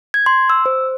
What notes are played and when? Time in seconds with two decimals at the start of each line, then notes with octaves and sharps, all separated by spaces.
0.14 G#6
0.26 C6
0.50 E6
0.66 C5